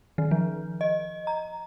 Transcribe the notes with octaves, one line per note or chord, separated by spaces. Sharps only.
D#3
F3
D#5
A#5